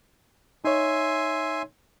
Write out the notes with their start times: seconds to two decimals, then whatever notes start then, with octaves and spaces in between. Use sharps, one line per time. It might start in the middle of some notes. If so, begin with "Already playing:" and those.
0.65 D#4 C#5 E5 G#5 C6